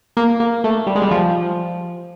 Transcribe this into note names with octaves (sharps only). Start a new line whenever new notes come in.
A#3
A#3
A3
G3
G#3
G3
F3